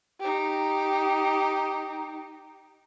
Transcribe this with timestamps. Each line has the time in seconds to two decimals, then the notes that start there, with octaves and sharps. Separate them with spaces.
0.20 D#4 G4